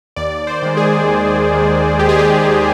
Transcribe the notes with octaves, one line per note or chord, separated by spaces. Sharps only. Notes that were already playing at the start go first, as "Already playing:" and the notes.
D#2 D5
C5
D#3 G#3
G#4
D#2
D#3 G#3
D#2 G4
G#4
G4
D#3 G#3